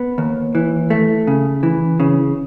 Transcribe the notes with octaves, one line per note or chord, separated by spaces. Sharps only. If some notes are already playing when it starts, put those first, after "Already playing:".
Already playing: B3
D#2
E3
A3
C#3
E3
C#3